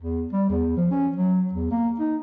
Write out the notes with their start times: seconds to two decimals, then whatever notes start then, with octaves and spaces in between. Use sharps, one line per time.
0.01 E2
0.33 G3
0.50 E2
0.77 F3
0.91 C#4
1.16 F#3
1.53 E2
1.71 A#3
2.00 D#4